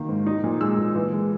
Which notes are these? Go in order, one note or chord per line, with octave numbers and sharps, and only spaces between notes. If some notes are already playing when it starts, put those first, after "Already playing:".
Already playing: D#3 A#3
G#2
D#4
A#2
G#3 E6
A#2
E3
G#3